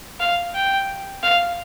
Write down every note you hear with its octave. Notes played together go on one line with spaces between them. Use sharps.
F5
G5
F5